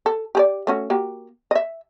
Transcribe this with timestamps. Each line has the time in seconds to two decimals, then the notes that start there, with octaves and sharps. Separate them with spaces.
0.06 A4
0.35 G4 G#4 D5
0.67 A3 C#4 F#4
0.90 A#3 F#4 G4
1.51 D#5 E5